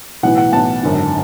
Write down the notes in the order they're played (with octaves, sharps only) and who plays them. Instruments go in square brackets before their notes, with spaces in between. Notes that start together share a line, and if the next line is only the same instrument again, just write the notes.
[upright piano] B1 A2 E3 B3 F#5
F#5
B1 A2 E3 B3 F#5 A5
G#1 F#2 D3